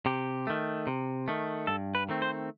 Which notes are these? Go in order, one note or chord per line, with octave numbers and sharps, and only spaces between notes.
C3 G4
D#3 A3
C3
D#3 A3
G2 A4
B4
D#3 A3 C4
C5